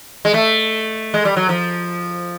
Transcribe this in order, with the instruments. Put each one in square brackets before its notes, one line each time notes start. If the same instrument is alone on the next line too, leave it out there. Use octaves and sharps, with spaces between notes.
[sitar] G#3
A3
G#3
G3
F#3
F3